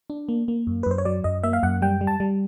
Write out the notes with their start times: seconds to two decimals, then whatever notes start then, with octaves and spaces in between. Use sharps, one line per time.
0.10 D4
0.29 A#3
0.48 A#3
0.67 F#2
0.83 B4
0.86 F#2 C5
0.98 C#5
1.05 F#3 D5
1.24 F#2 D#5
1.43 A#3 E5
1.53 F5
1.63 F#2 F#5
1.82 G3 G5
2.01 G3
2.07 A5
2.20 G3